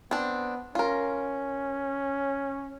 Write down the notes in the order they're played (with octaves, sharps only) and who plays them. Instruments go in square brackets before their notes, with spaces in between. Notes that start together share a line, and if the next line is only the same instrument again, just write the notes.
[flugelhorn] B3 [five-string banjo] C4 D4
[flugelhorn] C#4 [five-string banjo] F4 A#4